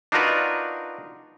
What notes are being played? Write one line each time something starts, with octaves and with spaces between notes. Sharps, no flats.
D4 D#4 F4 F#4 A#4 B4